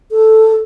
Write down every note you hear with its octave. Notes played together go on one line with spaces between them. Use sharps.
A4